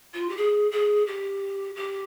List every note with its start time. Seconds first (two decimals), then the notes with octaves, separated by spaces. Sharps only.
0.14 F4
0.29 G4
0.37 G#4
0.71 G#4
1.07 G4
1.76 G4